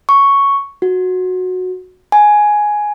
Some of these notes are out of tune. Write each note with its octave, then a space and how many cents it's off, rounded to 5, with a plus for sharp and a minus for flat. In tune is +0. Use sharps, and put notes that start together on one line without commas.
C#6 +5
F#4 -10
G#5 +10